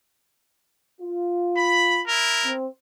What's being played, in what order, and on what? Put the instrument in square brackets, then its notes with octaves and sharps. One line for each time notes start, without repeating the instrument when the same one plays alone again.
[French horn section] F4
[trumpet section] B5
E4 A#4
[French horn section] C4